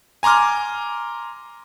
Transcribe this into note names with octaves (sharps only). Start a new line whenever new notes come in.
G#5 A#5 C6 D6 F6